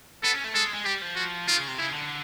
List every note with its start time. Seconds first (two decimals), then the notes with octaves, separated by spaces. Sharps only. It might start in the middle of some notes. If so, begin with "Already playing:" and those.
0.23 B3 A4
0.33 C#4
0.44 A3
0.54 G#3 A4
0.74 G#3
0.85 G3 G4
1.01 F3
1.16 F#4
1.48 D#3 F4
1.57 C#3
1.68 C3
1.78 C#3 E4
1.93 D3